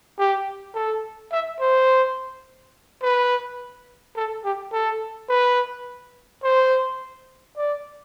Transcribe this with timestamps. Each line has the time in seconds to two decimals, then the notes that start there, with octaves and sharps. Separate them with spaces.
0.19 G4
0.75 A4
1.32 E5
1.60 C5
3.03 B4
4.16 A4
4.44 G4
4.73 A4
5.30 B4
6.43 C5
7.57 D5